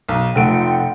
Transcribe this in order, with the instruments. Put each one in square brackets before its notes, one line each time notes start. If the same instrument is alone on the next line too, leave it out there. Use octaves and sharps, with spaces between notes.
[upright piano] B1
[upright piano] F1 A3 D7 [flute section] F4 F#5 G5